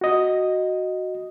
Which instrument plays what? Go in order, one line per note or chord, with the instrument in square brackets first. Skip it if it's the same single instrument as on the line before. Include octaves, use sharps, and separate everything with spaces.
[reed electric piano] F#4 D#5